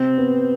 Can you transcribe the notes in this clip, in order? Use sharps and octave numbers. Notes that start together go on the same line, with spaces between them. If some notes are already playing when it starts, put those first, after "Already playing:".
Already playing: C3 C4
B3